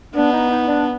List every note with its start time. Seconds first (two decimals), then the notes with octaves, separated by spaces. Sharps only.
0.15 B3 D4
0.32 D#4
0.50 D#4
0.67 D4